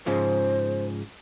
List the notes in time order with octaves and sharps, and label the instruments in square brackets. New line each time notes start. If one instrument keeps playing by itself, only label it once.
[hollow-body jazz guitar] G#2 C#3 F3 [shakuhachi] C5